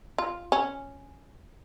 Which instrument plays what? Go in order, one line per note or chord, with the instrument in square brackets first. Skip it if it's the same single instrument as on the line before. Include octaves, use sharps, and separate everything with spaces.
[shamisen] F4
C#4